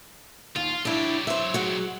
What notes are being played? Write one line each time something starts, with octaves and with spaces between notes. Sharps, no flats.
D#2 F4
F#3 D4 E4 G4
C5 E5
G#3 F#4